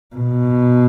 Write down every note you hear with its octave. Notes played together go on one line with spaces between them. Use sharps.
B2